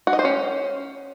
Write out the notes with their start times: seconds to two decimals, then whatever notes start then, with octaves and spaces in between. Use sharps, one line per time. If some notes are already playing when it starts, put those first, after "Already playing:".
0.07 F#4
0.13 D#5
0.19 C5
0.25 C#4